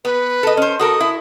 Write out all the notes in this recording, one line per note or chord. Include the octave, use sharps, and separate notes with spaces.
B3 B4
A4 D#5
C#4 C5
F#4 A4 A#4 D#6
E4